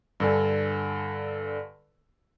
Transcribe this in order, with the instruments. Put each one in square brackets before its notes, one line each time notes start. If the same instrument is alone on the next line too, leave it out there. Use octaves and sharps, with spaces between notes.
[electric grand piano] G2 D3 A4 G#5